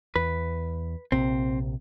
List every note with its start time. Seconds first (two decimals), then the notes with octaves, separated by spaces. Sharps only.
0.16 E2 B4
1.12 A#1 C3 C4